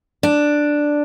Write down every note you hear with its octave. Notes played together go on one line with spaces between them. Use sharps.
D4